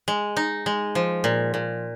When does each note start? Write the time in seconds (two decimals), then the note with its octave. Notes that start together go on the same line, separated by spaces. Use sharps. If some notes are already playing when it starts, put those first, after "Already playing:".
0.08 G#3
0.37 D#4
0.66 G#3
0.95 F3
1.24 A#2
1.54 A#2